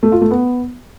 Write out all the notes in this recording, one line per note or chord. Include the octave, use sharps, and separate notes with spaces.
A3
F4
A3
B3